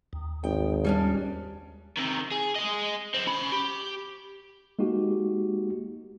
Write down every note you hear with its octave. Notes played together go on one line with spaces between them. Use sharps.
D#2
G#1 G5
G3 C#4 D4
C3 D#3
G#4
G#4 D#5
F#2 C4
C#4 B5
G4
G#3 A#3 D#4 F#4 G4